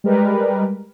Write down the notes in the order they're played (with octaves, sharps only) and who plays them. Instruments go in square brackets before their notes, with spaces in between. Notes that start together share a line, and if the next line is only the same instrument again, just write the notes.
[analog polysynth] G3 G#3 A#4 B4